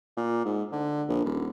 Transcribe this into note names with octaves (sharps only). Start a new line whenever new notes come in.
A#2
G#2
D3
A#1
D#1